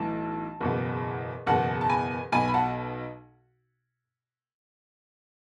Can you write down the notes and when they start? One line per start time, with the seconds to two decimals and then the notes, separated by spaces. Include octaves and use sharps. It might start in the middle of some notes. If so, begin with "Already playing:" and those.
Already playing: B1 A2 E3 A5
0.60 F#1 E2 B2
1.46 F#1 E2 B2 F#5 A5
1.81 A5
1.89 G#5 B5
2.32 B1 B2 G#5 B5
2.48 B5
2.54 F#5 A5